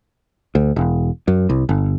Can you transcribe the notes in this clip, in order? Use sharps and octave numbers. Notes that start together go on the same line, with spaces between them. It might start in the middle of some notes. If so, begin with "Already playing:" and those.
D2
E1
F#2
C2
G1